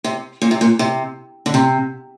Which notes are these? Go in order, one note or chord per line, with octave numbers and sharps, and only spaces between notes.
C3
A#2
C3
A#2
C3
D3
C3